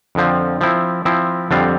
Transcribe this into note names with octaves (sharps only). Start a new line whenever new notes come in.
F2 D3 F3 C4
F3 C4 E4
F3 C4 E4
F2 D3 G3 C4 F4